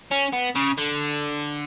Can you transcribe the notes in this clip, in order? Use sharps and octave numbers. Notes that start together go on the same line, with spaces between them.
C#4
B3
C#3
D3